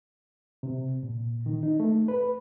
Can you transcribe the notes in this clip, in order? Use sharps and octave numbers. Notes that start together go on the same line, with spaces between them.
C3
A#2
D#3
D#4
A3
B4